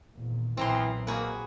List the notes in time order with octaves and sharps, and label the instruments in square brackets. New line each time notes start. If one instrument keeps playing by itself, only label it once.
[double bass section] G#1 E2 A#2
[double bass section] B1 A#2 [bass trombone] E3 [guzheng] C4 A#5 C6
[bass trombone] A#3 [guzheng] F#4 G#4 B4